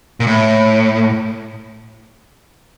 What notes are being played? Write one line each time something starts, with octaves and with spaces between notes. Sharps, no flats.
A#2
A2